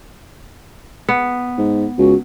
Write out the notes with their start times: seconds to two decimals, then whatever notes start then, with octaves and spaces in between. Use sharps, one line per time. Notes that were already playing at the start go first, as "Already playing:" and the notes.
1.09 B3
1.58 G#2
1.98 C#2 F#4